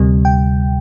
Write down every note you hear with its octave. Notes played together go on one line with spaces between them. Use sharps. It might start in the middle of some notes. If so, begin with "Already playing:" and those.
Already playing: D2 C3 G3
G5